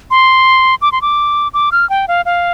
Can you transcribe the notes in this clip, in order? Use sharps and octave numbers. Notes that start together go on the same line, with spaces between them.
C6
D6
C6
D6
D6
F6
G5
F5
F5